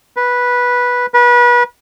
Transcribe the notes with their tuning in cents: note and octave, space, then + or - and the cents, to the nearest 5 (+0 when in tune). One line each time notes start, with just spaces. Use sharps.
B4 -10
B4 -30